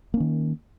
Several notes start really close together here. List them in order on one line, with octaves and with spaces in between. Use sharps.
A#3 C#4 D#3